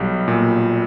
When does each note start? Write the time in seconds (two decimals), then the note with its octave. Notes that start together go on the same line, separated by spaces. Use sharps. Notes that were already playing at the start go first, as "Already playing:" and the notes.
Already playing: B1 G3
0.28 A#2